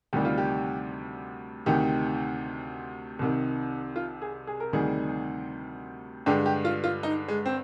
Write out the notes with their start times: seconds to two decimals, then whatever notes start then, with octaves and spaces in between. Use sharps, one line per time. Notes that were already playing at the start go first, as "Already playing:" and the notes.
0.13 D2 C3 D#3 G3 G4
0.25 F4
0.38 G4
1.66 D2 C3 D#3 G4
3.19 C2 C3 D#3
3.96 F4
4.22 G#4
4.47 G#4
4.60 A#4
4.73 D2 C3 D#3 G3 G#4
6.26 G2 D3 G#3 G4
6.46 G4
6.65 F4
6.84 F4
7.03 D#4
7.28 G#3
7.46 C4